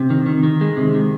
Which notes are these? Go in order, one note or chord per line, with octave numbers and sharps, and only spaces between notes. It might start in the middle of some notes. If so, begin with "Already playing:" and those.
Already playing: C3
D#3
D#3
D#3
G#3
C3
D#3